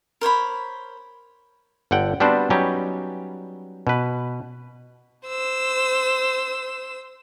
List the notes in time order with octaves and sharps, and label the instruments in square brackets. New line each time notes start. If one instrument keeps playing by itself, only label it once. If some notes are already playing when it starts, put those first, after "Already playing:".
[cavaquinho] A#4 C5 C#5 B5
[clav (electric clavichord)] G1 D3 F#5 G5
G3 B3 C4 D4 F#4 C5
F#3 G3 B3 C#4 D#4 G4
B2 B4
[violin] C5 E6